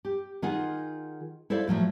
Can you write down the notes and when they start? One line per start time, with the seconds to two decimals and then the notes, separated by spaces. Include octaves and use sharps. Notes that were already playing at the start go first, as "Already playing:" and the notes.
0.05 G4
0.42 D#3 F4 G#4 F#5
1.50 E4 A4 C5 D5 F5
1.67 A2 F3 F#3 A3